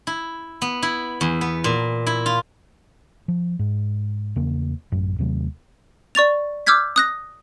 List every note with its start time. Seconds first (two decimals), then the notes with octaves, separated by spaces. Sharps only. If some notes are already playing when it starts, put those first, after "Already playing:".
0.07 E4
0.62 B3
0.83 E4
1.21 E2
1.41 B3
1.64 A#2
2.07 E4
2.26 F4
3.28 F3
3.59 G#2
4.36 E2 C#3 A#3
4.92 A1 F#2
5.18 D#2 C3 F#3 A3
6.15 D5 C#6 A6 F7
6.66 D6 E6 F6 G6 G#6 B6
6.96 D#6 F#6 A#6